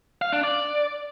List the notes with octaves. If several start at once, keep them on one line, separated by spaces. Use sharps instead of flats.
F5
D4
D5